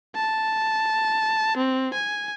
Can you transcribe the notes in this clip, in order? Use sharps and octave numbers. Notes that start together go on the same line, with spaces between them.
A5
C4
G#5